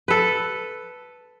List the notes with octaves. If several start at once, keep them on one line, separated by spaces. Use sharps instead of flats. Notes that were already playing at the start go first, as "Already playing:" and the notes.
A4 B4